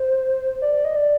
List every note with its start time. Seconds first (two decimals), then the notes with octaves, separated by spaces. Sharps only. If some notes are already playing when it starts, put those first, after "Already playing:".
Already playing: C5
0.62 D5
0.73 D5
0.85 D#5
0.96 D5